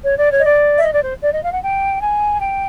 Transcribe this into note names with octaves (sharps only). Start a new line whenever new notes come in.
C#5
D5
C#5
D#5
D5
E5
D#5
D5
C5
D5
D#5
F5
F#5
G5
G#5
G5